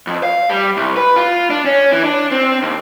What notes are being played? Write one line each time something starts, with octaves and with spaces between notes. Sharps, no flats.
F2
F5
G3
C2
B4
F4
D4
C#4
E3
D4
C4
D#2